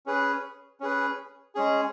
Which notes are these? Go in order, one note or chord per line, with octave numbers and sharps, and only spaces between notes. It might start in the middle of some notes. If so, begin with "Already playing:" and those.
C#4 G#4 B4
C#4 G#4 B4
G#3 C#4 G#4